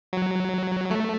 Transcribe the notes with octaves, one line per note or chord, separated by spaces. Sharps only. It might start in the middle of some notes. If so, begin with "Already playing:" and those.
F#3
A3